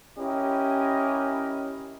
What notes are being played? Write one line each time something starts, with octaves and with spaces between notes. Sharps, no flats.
C#4 E4 G4 A#4 D#5